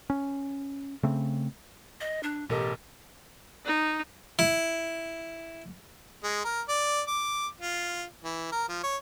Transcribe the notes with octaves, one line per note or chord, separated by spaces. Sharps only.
C#4
C#3 A3 C4
D#5
D4
A1 B2 G4 A4 A#4 D#5
D#4
E4
G#3
A#4
D5
D6
F4
E3
A#4
F3
C#5